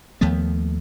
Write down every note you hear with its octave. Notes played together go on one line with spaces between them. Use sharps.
D#2 F3 A3 B3